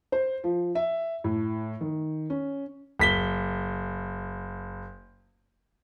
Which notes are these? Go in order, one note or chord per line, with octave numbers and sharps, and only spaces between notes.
C5
F3
E5
A2
D#3
C#4
F#1 B6 G7